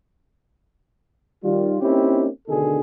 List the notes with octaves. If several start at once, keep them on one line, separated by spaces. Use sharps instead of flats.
D#3 G3 F4
A#3 C4 C#4 D#4 E4 G4
D2 B2 D3 D#3 G#4 A4